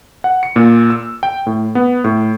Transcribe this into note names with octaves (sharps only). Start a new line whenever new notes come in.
F#5
C#7
A#2
E6
G5
A2
B3
A2